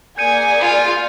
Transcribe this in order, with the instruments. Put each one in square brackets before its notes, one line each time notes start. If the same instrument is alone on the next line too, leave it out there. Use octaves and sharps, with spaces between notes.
[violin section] A#3 G#4 G#5 [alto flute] D5 [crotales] G6 C#7 D#7
[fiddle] F4 F5